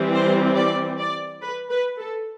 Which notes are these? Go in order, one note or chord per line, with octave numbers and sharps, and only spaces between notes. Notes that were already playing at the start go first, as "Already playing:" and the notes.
Already playing: E3 G3 C4
C5
D5
D5
B4
B4
A4